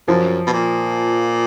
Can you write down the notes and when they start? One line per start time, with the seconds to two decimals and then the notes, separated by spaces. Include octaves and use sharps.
0.08 F#2 F3
0.47 B2
0.53 A#2